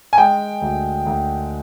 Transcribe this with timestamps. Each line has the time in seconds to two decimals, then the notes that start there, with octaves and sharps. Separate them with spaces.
0.13 G#5
0.18 G#3 G5
0.61 D2
1.06 D2